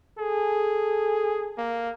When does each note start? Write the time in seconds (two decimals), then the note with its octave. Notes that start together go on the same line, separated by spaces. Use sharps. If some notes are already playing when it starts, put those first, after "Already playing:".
0.18 G#4 A4
1.58 A#3